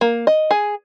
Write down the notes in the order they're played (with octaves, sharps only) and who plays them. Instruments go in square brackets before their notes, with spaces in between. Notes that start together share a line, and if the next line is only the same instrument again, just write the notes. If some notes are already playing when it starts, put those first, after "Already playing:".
[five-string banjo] A#3
D#5
G#4